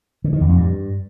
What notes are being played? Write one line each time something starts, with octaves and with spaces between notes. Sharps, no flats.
D3
D#3
E2
F2
G2